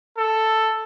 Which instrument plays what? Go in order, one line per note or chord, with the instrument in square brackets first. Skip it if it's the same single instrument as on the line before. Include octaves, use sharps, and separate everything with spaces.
[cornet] A4